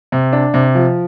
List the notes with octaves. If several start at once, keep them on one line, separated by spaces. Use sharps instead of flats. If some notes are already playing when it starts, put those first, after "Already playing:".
C3
D4
C3
F3